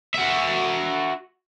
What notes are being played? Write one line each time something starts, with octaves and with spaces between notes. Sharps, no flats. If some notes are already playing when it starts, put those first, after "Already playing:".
F#4 E5